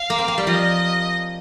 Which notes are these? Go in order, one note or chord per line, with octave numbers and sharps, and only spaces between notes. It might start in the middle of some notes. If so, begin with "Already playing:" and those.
Already playing: F5
A#3
C4
A#3
G3
F3 D#5